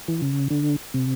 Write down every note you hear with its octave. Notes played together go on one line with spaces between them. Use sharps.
E3
C#3
D3
C3